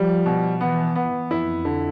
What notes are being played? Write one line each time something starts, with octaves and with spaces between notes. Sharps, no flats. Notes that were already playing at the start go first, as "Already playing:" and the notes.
Already playing: F3 G3
B2
E3 B3
B3
F2 E4
D3